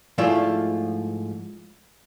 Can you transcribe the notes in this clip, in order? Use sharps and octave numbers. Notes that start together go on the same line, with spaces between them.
G#2 F3 A3 E4 F4 D5